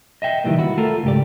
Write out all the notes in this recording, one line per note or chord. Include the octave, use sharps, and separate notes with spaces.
D#5 E5 G5
C#2 D#3 E3 G3 A#3
E4 F#4
A3 F4 A4 A#4
C#2 G#2 G4 D5